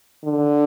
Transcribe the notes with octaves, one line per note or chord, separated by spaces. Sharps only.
D3